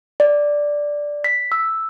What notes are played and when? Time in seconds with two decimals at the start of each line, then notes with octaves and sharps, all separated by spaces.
0.20 D5
1.24 B6
1.52 E6